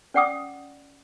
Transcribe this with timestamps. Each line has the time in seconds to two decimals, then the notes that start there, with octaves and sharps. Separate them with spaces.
0.14 C#4 D5 F#5 G5 D6 D#6